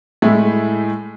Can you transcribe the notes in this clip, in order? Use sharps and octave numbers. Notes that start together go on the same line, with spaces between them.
A2 G#3 A3 E4